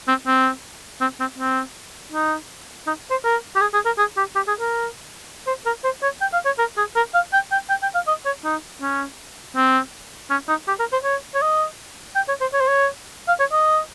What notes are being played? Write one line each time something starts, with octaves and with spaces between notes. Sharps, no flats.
C4
C4
C4
C4
C4
D#4
D#4
C5
A#4
G4
G#4
G#4
A#4
G#4
G4
G4
G#4
A#4
C5
A#4
C5
C#5
G5
F5
C#5
A#4
G#4
A#4
F5
G5
G5
G5
G5
F5
D#5
C#5
D#4
C#4
C4
C#4
D#4
G4
A#4
C5
C#5
C#5
D#5
G5
C#5
C5
C#5
C5
C#5
F5
C#5
D#5